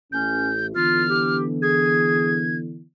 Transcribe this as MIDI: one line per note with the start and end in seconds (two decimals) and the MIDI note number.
0.12 0.73 33
0.12 0.52 61
0.12 0.67 91
0.75 2.82 50
0.75 2.82 52
0.75 2.82 59
0.75 1.03 65
0.75 1.37 89
1.10 1.43 67
1.62 2.42 68
1.62 2.57 92